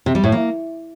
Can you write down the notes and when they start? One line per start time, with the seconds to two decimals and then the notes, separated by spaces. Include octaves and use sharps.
0.06 C3
0.15 G3
0.24 A2
0.32 A#3